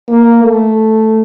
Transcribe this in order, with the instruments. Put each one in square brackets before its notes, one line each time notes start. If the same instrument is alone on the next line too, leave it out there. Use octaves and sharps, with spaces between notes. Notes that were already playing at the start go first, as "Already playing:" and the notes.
[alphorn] A#3
A3